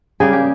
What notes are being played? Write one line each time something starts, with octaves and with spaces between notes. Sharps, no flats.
C#3 G3 A#3 G#4
G4